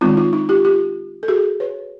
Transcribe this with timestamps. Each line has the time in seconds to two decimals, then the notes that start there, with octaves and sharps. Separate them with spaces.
0.01 D#3 G#3 C4 D#4 F4
0.17 D#4 F4
0.33 D#4
0.49 F4 G4
0.65 F4 G4
1.23 A4
1.28 F#4 G#4
1.60 B4 C#5